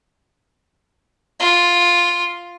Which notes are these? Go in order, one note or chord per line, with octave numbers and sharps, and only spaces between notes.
F4